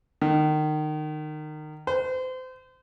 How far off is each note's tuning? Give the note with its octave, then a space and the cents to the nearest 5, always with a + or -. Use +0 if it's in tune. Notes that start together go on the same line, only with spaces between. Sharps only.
D#3 -25
C5 -30